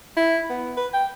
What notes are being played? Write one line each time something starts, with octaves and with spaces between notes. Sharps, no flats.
E4
B3
B4
G5